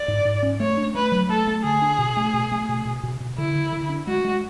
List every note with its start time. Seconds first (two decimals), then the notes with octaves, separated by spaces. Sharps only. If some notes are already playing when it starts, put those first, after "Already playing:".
Already playing: D5
0.08 G#2
0.25 G#2
0.43 C#4
0.60 A3 C#5
0.77 D4
0.95 A3 B4
1.12 F#3
1.29 A3 A4
1.47 A3
1.64 D3 G#4
1.82 D4
1.99 B2
2.17 A3
2.34 B2
2.52 A3
2.69 B2
2.85 B2
3.03 B2
3.20 B2
3.38 D3 E4
3.55 D3
3.72 D3
3.89 D4
4.07 G#3 F#4
4.24 G#3